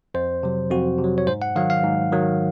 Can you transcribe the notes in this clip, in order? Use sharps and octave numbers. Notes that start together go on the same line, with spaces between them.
F2 C5
C3 F#3
F2 F#4
C3
F#3
C#5
G#2 C5
F#5
D#3 F#3 F5
F5
G#2
D#3 F#3